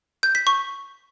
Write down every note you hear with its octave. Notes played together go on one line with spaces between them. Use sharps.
G6
B6
C#6